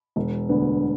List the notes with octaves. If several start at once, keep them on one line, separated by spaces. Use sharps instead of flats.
E1
D2 D3 B3